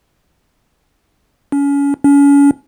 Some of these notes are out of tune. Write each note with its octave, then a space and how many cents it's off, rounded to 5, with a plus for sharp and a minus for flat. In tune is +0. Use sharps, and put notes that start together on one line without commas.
C#4 +30
C#4 +35